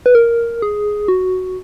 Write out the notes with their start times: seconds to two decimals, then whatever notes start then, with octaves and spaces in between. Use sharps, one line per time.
0.06 B4
0.15 A#4
0.62 G#4
1.08 F#4